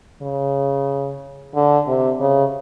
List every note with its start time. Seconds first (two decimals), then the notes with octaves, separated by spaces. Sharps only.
0.22 C#3
1.55 D3
1.88 C3
2.20 C#3